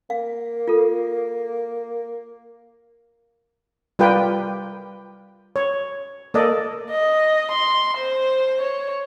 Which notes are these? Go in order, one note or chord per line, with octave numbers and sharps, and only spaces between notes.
A#3 F5
F4 A4
G3 F4 G4 A#4 B4 G5
C#5
A#3 A4 D5 D#5
D#5
C6
C5
C#5